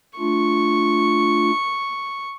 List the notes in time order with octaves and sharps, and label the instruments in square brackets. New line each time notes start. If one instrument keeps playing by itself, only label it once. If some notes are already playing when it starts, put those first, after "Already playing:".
[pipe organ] A3 D4 F4 [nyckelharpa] C#6